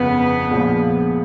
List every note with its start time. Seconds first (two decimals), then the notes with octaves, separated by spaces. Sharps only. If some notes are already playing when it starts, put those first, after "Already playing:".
Already playing: G1 F2 C#3 B3
0.51 A#1 A#2 F3 G#3